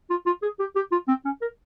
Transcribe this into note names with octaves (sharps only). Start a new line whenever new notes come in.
F4
F4
G#4
G4
G4
F4
C4
C#4
A#4